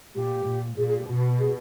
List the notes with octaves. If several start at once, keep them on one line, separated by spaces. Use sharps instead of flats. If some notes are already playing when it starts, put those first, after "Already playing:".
A#2 G4
A#2
A#2 G#4
G#4
G4
B2 F#4
G#4